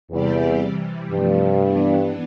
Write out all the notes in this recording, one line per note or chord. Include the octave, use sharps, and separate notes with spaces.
E2 C3 G3 C4 G4 D5
C3 E3 G3
G2 C3 F3 A3
E3 B3 D4